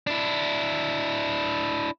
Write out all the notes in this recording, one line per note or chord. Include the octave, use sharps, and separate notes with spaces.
D4 E4